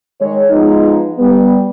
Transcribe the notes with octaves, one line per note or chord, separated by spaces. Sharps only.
D#3 G#3 G#4 C#5
F3 G#3 B3 D#4
G3 B3